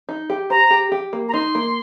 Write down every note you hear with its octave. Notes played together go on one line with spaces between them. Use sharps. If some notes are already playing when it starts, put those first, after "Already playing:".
D#4
G4
C5 A#5
G4
G4
A#3
A#5
D#4 C6
A#3